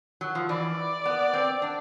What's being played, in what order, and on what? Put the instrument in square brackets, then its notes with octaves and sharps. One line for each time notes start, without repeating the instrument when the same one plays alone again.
[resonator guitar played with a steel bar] F#3
F3
[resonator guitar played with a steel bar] E3 [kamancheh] D5
[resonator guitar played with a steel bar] B3
C4
D4